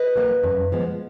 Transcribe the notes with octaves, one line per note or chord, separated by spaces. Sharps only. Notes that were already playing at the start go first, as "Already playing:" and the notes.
Already playing: B4 D#5
F#3 A#3
F#2
F3 G#3 B3